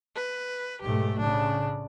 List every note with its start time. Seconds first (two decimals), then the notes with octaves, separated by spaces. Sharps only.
0.16 B4
0.82 B1 G#2 A3 G4
1.19 A2 C#3 D4